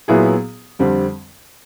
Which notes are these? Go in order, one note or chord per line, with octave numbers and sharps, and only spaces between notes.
A#2 F#3 B3 E4 G#4
F2 D3 G3 C4